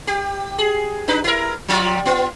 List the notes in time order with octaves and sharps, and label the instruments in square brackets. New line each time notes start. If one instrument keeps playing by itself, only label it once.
[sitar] G4
G#4
D4 D#4 B4
E4 A#4
F3 G3 F4
B3 F4